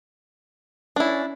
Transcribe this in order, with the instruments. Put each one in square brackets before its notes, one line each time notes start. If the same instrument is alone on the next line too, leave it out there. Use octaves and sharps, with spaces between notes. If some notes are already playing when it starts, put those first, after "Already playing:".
[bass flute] C#4 [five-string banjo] D4 E4